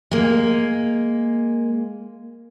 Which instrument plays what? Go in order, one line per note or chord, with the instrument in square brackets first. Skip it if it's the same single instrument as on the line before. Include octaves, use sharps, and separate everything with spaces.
[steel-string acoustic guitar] G#3 A#3